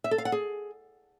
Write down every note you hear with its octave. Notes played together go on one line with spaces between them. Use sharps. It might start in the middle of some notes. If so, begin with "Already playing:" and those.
E5
A4
F5
F#5
G#4